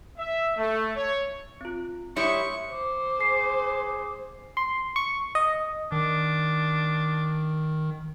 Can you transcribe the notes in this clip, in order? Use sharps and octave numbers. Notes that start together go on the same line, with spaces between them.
E5
A3
C#5
C4 F4
G3 E4 C#5 C6 C#6 D#6
C5 D6
G#4 C7
C6
C#6
D#5
D#3 D4